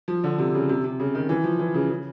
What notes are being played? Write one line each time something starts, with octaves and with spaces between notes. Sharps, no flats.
F3
D3
C3
C#3
C3
C3
C#3
D#3
E3
F3
E3
C#3
C#3